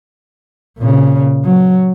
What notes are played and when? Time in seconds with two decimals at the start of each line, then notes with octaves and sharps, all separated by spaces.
0.79 A#2 C#3
1.45 F#3